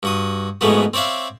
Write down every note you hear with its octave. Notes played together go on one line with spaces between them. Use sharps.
G2 F#4 D#6
F2 G#2 G#3 A3 B3 F#4
C4 C#5 D5 E5 F5